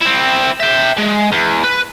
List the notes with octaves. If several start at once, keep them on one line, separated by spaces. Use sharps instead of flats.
C4 E4
E5 G5
G#3
E2
B4